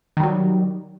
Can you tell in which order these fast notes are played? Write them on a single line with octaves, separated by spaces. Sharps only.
D#3 G3 F#3